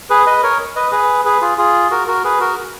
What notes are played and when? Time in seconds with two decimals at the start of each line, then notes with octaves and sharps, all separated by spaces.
0.10 G#4 B4
0.26 B4 D#5
0.43 A#4 C#5
0.76 B4 D#5
0.92 G#4 B4
1.25 G#4 B4
1.41 F4 G#4
1.58 F4 G#4
1.91 F#4 A#4
2.08 F#4 A#4
2.24 G#4 B4
2.40 F#4 A#4